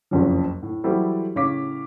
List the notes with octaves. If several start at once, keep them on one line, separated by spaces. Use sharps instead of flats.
F#1 C2 F2 C#3 F3
A2
E3 F#3 G3 E4 A4 C5
A2 C#3 C#5 F5 D6 B6